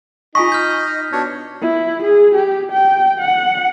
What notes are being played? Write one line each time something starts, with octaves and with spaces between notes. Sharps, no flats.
D#4 F4 D#5 G#5 C#6 B6
F6 G6
B2 D4 C#5
E4
G#4
G4
G5
F#5